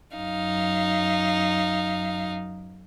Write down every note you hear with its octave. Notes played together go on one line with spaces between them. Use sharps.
F#2 D#4 F5